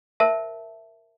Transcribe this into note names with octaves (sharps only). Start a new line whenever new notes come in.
A#4 C5 E5 A5